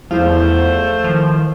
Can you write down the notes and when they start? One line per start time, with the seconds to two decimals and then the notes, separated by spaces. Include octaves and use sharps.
0.11 E2 F3 A3 E4 C5 F5
1.04 D#3 F3